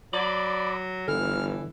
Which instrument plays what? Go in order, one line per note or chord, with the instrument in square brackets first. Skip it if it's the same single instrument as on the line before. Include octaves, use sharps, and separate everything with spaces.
[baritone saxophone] F#3 [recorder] D5 [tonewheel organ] B5 D6
[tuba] G1 [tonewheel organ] D3 [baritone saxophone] E3 [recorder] F6